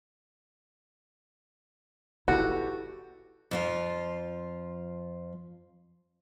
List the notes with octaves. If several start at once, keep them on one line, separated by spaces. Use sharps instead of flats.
E4 F#4 G4 A4 B4
F2 F3 F4